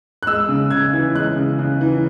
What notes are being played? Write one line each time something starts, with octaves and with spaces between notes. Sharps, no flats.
F#6
G#3 E6
C#3
C#3 G#6
E3
G#3 F#6
C#3
C#3
E3